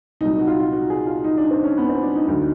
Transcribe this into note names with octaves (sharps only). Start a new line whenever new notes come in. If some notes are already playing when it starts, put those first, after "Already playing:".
C2 A#2 F#3 D#4
F#4
F4
F4
F#4
G#4
F4
D#4
D4
C4
C#4
B3
C4
D4
D#4
D2 D3 F#3 D#4